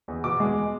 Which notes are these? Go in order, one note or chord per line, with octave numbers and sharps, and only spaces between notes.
E2
B2 D6
G#3